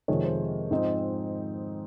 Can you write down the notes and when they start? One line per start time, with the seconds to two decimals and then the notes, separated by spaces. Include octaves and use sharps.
0.08 F2 C3 D#3 G#3 C#5
0.24 C5
0.71 G#2 F3 C4 D#4